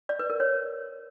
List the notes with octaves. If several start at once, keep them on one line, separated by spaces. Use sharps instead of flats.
D5
B4
A#4
C#5